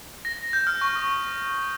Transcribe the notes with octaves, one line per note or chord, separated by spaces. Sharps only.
A#6
G6
F6
C#6
D#6